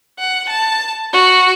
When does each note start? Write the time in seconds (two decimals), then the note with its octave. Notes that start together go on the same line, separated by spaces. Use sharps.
0.19 F#5
0.50 A5
1.13 F#4